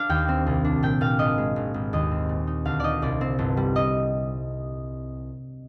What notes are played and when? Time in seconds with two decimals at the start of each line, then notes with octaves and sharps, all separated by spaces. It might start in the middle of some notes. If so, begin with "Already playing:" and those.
Already playing: D4 F5
0.09 D#2 G5
0.28 C4
0.46 C2
0.65 D4
0.83 A#2 G5
1.01 A#2 F5
1.19 G#1 D#5
1.38 G#3
1.56 G#1
1.74 G#1
1.93 D#2 D#5
2.11 C4
2.29 A#2
2.47 D#4
2.65 D2 F5
2.80 D#4 D5 D#5
3.02 C2 D5
3.21 C4
3.39 G1
3.57 G3
3.76 D#5